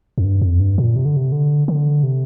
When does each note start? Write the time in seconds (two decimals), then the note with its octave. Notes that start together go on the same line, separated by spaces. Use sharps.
0.18 F2
0.24 G2
0.41 F2
0.60 G2
0.78 A#2
0.96 C3
1.05 D3
1.17 C3
1.32 D3
1.68 D3
2.03 C3